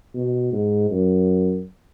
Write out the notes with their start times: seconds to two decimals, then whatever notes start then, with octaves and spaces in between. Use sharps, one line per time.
0.14 B2
0.52 G#2
0.90 F#2